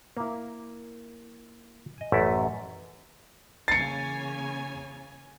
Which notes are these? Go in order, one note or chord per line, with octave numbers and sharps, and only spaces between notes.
A#3 E4
D#5 G#5
A1 F#2 A3 C#5 D5 E5
C#3 E3 A#3 C#5 G#5 A6 C7 C#7